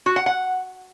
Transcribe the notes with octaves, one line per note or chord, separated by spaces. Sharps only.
F#4
F#5
F#5